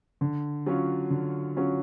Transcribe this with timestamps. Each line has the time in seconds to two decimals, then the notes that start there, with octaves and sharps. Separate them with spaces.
0.21 D3
0.66 F#3 C#4 F4
1.10 D3
1.56 F#3 C#4 F4